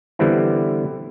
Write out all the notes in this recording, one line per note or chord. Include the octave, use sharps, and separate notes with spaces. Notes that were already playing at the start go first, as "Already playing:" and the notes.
D3 E3 G3 B3 C4 E4